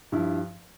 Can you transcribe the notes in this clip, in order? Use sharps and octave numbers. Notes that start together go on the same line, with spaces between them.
G2 F3 E4